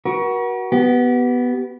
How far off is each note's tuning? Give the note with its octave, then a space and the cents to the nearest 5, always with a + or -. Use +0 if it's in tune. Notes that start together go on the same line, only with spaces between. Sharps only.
F#4 +15 A#4 +45
B3 +0 G4 -25